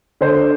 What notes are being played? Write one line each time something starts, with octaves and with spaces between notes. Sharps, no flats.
D3 C5